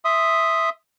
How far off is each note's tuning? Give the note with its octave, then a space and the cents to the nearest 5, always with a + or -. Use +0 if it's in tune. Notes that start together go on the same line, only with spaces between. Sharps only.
E5 +0 C6 +0 D#6 +0